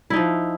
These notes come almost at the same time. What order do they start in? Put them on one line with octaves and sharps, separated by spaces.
E4 D#4 F3